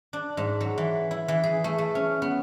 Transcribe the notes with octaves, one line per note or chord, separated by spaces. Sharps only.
D4
G#2
F#3
E3
E4
E3
G#4
A3
A3
C#4
B3